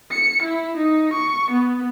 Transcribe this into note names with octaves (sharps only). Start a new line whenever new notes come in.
C#7
E4
D#4
C#6
B3